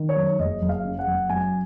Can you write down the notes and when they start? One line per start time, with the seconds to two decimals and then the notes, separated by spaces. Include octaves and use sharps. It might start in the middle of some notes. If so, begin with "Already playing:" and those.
Already playing: D#3
0.09 C#5
0.16 F#2
0.39 F#1 D#5
0.62 F#1
0.69 F5
0.84 C#3
0.99 F#5
1.07 F#1
1.29 F#2 G#5